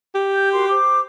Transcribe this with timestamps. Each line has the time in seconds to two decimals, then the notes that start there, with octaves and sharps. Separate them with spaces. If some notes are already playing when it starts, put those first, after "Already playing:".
0.14 G4
0.34 G6
0.53 F#4 A#4 C6
0.69 C5 D6